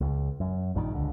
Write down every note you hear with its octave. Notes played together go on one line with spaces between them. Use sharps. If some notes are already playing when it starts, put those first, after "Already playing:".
C#2
F#2
A#1 G2 D3 D#3
C#2 D3